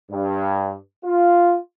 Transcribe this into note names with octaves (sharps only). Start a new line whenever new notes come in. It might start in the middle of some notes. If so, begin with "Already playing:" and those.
G2
F4